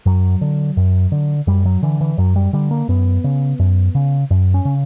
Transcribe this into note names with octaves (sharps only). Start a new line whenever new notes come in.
F#2 F#3
D3
F#2
D3
F#2 G3
F#3
D3 E3
E3
F#2 F#3
G3
D3 G3
A#3
F#2 B3
C#3
F#2
C#3
F#2
C#4
C#3